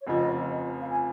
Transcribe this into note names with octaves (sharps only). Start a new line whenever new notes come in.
C#5
F1 F2 C#3 F3 D#5
F5
G#5